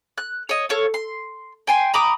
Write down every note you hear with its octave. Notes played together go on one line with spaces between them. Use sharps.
F#6
C#5 D#5
A4 C#5 F5
C6
G5 G#5 C6
A#5 B5 D6 D#6